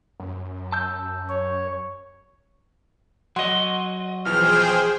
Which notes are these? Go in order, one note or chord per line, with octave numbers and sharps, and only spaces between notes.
F#2
A5 E6 G6
C#5
F#3 D#5 F#5 C6
B1 E3 F3 G#4 C5 G5 F6